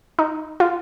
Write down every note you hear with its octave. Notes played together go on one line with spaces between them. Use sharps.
D#4
F4